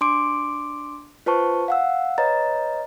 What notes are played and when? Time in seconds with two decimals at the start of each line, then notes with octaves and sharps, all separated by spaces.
0.01 D4 C6 D6 D7
1.26 F4 B4 C5 A5 C#6
1.68 F5 F#5 E6
2.18 B4 C#5 D#5 A#5 A6